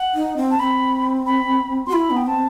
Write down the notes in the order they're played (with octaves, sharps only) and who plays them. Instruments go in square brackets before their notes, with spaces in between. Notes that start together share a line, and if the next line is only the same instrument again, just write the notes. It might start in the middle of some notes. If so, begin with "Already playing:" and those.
Already playing: [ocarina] F#5
[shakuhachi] D#4
C4
[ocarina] A5
[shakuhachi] C4 [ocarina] B5
[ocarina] B5
[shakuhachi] F#4 [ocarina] C6
[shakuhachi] E4 [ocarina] B5
[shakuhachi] B3
[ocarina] G5
[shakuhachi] C4 [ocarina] A5